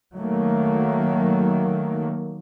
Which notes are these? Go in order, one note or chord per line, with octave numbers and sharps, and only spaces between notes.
D#3 F#3 A3 A#3